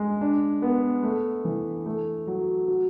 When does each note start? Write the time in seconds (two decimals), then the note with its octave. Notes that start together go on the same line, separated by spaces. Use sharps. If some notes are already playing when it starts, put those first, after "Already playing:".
Already playing: G#3
0.21 D4
0.62 B3
1.03 A3
1.45 E3
1.86 A3
2.27 F#3
2.68 F#4